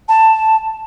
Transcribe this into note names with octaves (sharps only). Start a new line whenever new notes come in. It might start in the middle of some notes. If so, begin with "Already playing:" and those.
A5